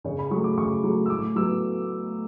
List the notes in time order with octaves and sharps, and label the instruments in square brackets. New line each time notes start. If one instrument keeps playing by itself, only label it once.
[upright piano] C#3 C#5
B5
F#3 A3 C#6
D6
C#3 C#6
F#3 A3
E6
A2 D6
F#3 B3 E6